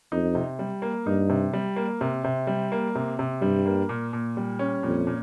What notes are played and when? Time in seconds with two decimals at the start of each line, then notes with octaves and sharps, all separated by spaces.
0.12 F2 D#4
0.35 C3
0.59 G3
0.82 A#3
1.06 G2 D#4
1.29 C3
1.53 G3
1.76 A#3
2.01 C3
2.24 C3
2.47 G3
2.72 A#3
2.95 C3
3.19 C3
3.42 G2 G3
3.66 A#3
3.89 A#2
4.13 A#2
4.37 G3
4.59 C#4
4.83 F2 A#2
5.07 A#2